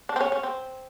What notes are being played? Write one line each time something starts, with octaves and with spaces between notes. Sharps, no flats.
D4
C4
C#4
C#4
C4